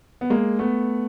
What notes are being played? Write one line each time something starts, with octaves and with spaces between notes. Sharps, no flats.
B3
G#3 A#3
A3 B3